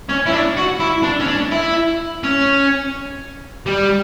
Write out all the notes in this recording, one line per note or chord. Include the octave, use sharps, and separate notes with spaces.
C#4
E4
D4
F#4
E4
D4
C#4
D4
E4
C#4
G3